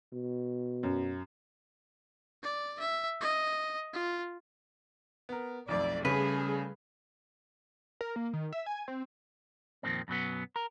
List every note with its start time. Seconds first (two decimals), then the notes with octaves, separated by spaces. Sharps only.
0.13 B2
0.83 F#2
2.43 D5
2.80 E5
3.21 D#5
3.94 F4
5.29 B3 A#4
5.68 B1 F2 A3 D5
6.05 C#3 G3 A3 C#4 G#4 B4
8.01 A#4
8.16 A#3
8.33 D#3
8.53 E5
8.66 G#5
8.88 C4
9.83 F2 A#2 D#3 C4
10.08 F#2 B2 F#3 B3
10.56 A#4